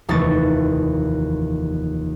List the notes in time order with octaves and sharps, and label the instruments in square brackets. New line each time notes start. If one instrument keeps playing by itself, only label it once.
[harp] F1 D#2 E3 A3 C#6 A6